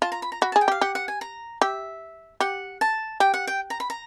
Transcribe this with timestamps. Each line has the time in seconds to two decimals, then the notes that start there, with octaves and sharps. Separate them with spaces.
0.02 F4 A5
0.12 A#5
0.22 B5
0.32 A#5
0.41 F#4 B5
0.52 G#4 A5
0.61 G5
0.68 G4 F5
0.81 G4 F#5
0.95 F#5
1.08 G#5
1.21 A#5
1.62 G4 E5
2.40 G4 F#5
2.81 A5
3.20 G4 G5
3.34 F#5
3.47 G5
3.70 A#5
3.80 B5
3.90 A#5